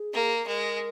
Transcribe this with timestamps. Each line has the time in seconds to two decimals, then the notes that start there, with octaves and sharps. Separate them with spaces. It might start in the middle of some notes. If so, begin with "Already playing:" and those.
Already playing: G#4
0.13 A#3
0.46 G#3 A#4